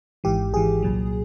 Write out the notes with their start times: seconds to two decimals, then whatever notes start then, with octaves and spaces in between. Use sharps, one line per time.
0.24 G#1 G#2 E3 G4
0.53 G#1 G#2 E3 G#4
0.82 C2 A#2 F#3